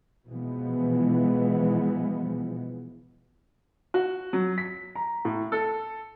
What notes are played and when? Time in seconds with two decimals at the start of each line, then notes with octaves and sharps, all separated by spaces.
0.27 B2 E3 F3 G#3 B3
3.94 F#4
4.33 F#3
4.58 B6
4.96 A#5
5.25 A2
5.52 A4